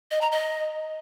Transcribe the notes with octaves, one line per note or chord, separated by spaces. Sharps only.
D#5
A#5
D#5